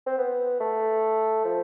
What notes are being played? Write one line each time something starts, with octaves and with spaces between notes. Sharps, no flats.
C4
B3
A3
F3